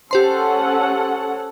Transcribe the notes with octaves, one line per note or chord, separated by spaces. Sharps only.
C#4 G4 A4 C5 F#5 C6